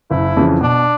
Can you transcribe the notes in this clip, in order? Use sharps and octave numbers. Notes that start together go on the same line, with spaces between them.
F#1 E4
F2 C#3 E3
B2 D4